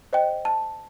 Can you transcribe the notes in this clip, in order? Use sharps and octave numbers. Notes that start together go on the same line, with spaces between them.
C5 D#5 G5
A5